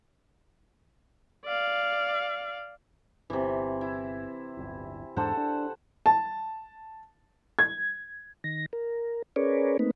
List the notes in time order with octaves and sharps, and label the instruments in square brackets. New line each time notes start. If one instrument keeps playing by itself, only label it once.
[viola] D5 F5
[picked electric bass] G1 [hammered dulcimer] C3 E3
[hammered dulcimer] E4
[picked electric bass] D1 G1
[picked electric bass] E2 G#2 D4 [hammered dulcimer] A4 C5 F#5
[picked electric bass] D4
[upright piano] A5
G#6
[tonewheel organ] D#3 A#6
A#4
C#4 G#4 A#4 B4 C#5 D5
A3 A#3 C4 D#4 B4